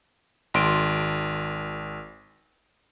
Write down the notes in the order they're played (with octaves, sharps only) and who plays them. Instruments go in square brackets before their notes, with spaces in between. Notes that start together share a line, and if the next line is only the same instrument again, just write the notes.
[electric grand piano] G#1 C6 D7